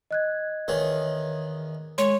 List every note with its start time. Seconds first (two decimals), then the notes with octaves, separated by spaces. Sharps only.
0.11 D#5 F#6 G#6
0.68 E2 D#3 G#4 C#5
1.98 G#3 C#5 C6